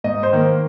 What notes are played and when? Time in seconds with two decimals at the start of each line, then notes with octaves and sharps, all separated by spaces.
0.04 G#2 D#5
0.23 C5
0.33 D#3 A#3